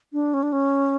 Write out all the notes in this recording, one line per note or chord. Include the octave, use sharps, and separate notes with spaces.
D4
C#4
D4
C#4